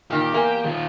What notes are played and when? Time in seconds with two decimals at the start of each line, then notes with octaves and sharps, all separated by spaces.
0.10 A#2 D#3 G4
0.32 E2 A#3 G#5
0.65 D#3 F4